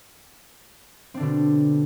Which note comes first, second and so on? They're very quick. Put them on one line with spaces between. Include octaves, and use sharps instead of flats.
C4 D4 D3 B2